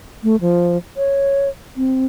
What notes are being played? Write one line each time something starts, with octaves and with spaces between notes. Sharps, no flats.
A3
F3
C#5
C4